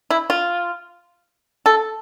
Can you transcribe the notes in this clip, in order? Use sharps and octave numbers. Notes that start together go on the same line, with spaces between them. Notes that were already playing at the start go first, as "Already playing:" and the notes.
E4
F4
A4